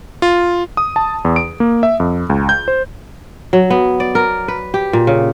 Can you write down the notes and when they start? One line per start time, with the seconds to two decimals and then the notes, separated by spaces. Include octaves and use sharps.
0.22 F4
0.77 D#6
0.96 A5
1.25 E2
1.36 D7
1.60 A#3
1.83 E5
2.00 F2
2.30 C#2
2.49 G6
2.68 C5
3.53 F#3
3.70 B3
4.00 D5
4.15 A#4
4.48 B4
4.74 G4
4.93 A#2
5.07 C#3